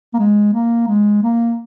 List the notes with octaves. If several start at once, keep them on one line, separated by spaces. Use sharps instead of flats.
A#3
G#3
A#3
G#3
A#3